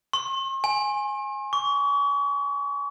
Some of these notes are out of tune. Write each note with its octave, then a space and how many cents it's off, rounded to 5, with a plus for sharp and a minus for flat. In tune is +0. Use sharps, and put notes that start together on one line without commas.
C6 +45
G#5 +0
C#6 +40